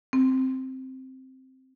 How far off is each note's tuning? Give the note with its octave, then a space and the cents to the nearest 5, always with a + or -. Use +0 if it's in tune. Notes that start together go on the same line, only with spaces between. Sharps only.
C4 +0